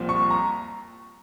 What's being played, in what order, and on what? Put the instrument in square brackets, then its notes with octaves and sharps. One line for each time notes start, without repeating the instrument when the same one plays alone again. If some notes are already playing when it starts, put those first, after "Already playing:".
Already playing: [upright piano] C2 A#2 F3 C4
C#6
A#5